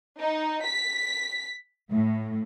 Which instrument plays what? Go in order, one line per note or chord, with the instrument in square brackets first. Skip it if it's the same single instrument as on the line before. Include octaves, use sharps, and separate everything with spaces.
[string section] D#4
B6
A2